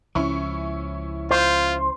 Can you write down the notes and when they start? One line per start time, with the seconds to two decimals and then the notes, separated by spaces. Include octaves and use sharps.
0.15 C#2 F3 C#4 E4 C#6
1.31 F4 C5